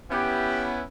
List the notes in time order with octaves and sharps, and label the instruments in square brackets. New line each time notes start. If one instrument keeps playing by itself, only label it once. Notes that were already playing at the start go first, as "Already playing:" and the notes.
[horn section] B3 C#4 E4 [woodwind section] G4